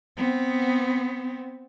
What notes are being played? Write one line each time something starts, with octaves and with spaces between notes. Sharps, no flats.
B3 C4